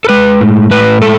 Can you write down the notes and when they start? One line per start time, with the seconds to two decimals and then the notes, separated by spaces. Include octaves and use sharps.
0.05 A4
0.09 G#3 B4
0.41 A2
0.71 A2 B4
1.02 G#3 A4